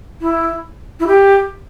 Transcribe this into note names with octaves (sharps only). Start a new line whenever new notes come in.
E4
E4
G4